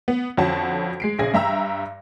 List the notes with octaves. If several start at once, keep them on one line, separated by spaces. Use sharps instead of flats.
B3
F2 D3 C#4 F#4 A5
G#3 C7 D7
A#1 C#3 G#4 G#5 A#6
G2 E5 G5 A#5 E6